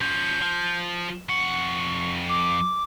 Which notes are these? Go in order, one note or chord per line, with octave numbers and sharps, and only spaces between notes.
F3 C#4 G6
F3
F2 F#5 C#6
D6